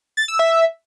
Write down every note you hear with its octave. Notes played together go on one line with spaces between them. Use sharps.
A6
E6
E5